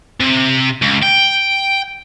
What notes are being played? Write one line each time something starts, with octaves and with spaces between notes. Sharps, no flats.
C3
C#2
G5